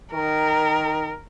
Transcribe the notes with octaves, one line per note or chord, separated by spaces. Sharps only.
D#3 A#4